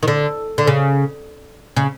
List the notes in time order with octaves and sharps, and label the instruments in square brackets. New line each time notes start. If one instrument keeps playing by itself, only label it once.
[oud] D#3
D3
D3
C#3
C#3